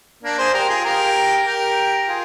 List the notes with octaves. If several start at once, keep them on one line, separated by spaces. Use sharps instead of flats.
A#3 D4
G#4 C5
G4 A#4
F4 G#4
G4 A#4
G4 A#4
F4 G#4